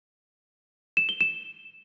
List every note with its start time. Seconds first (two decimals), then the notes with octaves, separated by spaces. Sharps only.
0.97 E7
1.09 G7
1.21 E7